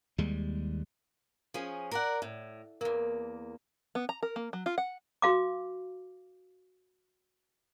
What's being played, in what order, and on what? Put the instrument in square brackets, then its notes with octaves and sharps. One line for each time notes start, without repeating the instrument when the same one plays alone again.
[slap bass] D#2 G3 G#3
[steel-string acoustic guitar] F3 C#4 G#4
A#4 D5 F#5
A2
[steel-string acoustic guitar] E2 A#3 [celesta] A#4
[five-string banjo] B3
A#5
A#4
A#3
F#3
F4
F#5
[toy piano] F#4 F5 D6